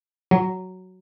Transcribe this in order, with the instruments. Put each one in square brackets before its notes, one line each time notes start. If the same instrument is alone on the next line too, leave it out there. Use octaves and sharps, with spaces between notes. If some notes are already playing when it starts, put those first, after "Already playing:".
[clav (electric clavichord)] F#3